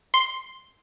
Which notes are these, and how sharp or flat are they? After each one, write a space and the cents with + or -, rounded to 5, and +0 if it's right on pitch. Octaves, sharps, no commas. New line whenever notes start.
C6 +0